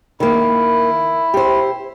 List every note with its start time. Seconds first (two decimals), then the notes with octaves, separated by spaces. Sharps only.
0.20 D#3 A#3 E4
1.34 G4 C5